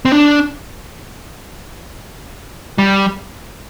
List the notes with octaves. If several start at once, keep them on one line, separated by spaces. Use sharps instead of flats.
C4
D4
G3